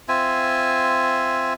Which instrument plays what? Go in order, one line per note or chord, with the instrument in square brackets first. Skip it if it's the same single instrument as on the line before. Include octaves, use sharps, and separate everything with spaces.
[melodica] C4 F4 E5 G#5